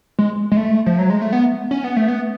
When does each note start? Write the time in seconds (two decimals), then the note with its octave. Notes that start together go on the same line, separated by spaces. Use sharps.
0.19 G#3
0.52 G#3
0.57 A3
0.86 F3
0.99 F#3
1.10 G#3
1.22 A3
1.33 B3
1.71 C#4
1.84 B3
1.97 A3
2.08 B3